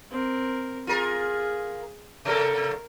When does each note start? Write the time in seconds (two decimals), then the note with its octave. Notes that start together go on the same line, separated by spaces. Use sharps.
0.11 C4 A#4
0.87 F4 G#4 A#4
2.25 C3 A4 A#4